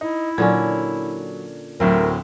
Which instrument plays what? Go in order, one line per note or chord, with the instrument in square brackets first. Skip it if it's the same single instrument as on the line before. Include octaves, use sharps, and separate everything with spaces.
[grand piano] D#4 [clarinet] E4
[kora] A#2 D3 C#4 [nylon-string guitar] F#3 [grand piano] G#6
[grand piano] D2 A2 C4 [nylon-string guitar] F#3 A3 [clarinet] A#4